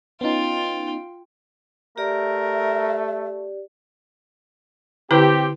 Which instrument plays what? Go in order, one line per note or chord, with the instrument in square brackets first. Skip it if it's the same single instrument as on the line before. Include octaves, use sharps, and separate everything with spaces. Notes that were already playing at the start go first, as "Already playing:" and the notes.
[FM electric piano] B3 C#4 D#4 [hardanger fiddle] F4 G5
[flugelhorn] A3 [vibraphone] G4 D5 [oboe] A#4 [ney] E5
[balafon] D3 E4 B4 [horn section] C4 G4